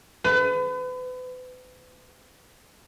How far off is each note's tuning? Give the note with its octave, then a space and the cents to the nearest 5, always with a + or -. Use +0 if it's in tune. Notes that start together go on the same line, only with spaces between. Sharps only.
B4 +35